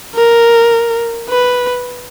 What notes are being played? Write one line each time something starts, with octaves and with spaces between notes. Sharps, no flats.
A#4
B4